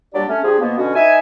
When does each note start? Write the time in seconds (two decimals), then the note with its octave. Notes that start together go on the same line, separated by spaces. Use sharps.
0.14 A#2 F#3 G3 D4 G4 D5
0.28 A3 C#4
0.43 F3 G3 D4 G4 G#4
0.59 B2 F3 A#3 B3
0.77 B2 D3 C#4 D4 F#4
0.95 E3 D#4 E5 G#5